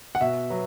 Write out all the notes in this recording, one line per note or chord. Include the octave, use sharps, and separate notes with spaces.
F#5
B2 E5
F#3 B3